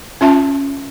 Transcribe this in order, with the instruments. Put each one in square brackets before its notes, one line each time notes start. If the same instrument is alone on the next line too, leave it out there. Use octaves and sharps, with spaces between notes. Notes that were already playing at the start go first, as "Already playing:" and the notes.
[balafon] C#4 F4 E5 A5